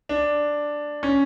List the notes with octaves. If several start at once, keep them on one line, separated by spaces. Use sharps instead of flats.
D4
C#4